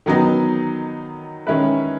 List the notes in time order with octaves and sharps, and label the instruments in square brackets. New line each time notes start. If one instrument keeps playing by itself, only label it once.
[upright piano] D#3 F#3 B3 D#4
D#3 G#3 C#4 E4 B4